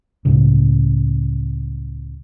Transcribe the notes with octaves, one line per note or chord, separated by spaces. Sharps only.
C#2 A2 C#3